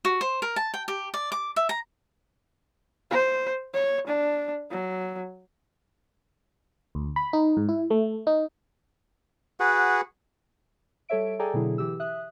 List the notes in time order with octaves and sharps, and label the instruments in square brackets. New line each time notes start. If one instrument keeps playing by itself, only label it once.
[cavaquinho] F#4
C5
A#4
A5
G5
G4
D5
D6
E5
A#5
[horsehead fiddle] C5
C#5
D4
F#3
[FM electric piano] D2
B5
D#4
G#2
E4
A3
D#4
[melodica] F#4 G#4 B4 F#5
[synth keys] G3 A4 C#5 E5 D7
G#4 A4 D5 G5 G#5 A#5
B2 D3 F#3 E4 G#4
E3 G4 E6
E5 D#6 F#6